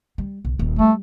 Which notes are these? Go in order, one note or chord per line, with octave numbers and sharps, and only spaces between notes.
G3
B1
D#1
G3 A3